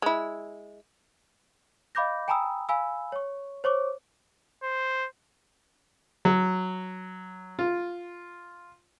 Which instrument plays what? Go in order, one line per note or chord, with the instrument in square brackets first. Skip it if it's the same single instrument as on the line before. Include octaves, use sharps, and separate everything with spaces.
[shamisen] G#3 E4
[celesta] D#5 F5 B5 D6 G6 A#6
G5 G#5 A#5 B5 D#6 E6
F5 G#5 B5 E6
C#5 C#6
C5 C#5 C#6 D6
[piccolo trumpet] C5
[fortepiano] F#3
F4